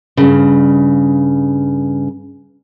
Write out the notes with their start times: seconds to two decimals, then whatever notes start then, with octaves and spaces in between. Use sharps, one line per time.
0.17 G2 C#3